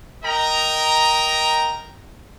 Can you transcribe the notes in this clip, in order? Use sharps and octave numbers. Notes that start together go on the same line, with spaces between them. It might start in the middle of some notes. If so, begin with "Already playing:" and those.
A#4 D#5 G5 A#5